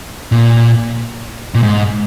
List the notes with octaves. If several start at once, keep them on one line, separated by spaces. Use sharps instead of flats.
A#2
A#2
G#2